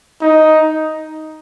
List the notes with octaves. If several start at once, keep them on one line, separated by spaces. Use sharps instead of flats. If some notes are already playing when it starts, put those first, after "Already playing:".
D#4